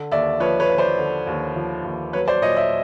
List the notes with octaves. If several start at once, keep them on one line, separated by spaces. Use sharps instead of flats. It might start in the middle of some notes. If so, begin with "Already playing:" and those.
Already playing: D3
D#2 D5 E5
F3 B4 C#5
B4 C#5
D#2
C5 D5
D3
D#2
F3
D#2
F#3 B4 C#5
C5 D5
A#2 C#5 D#5
D5 E5